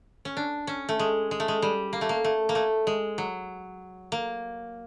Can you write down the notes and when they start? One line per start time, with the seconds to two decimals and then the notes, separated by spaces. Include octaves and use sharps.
0.25 C#4
0.37 D4
0.67 C#4
0.89 A3
0.99 G#3
1.31 G#3
1.40 A3
1.48 G#3
1.62 G3
1.93 A#3
2.01 A3
2.09 A#3
2.24 A3
2.49 A#3
2.55 A3
2.87 G#3
3.18 F#3
4.12 A#3